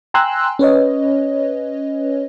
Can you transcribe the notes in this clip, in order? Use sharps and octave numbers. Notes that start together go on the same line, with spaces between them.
G5 G#5 A#5 C6 E6 F#6
C#4 B4 C#5 D#5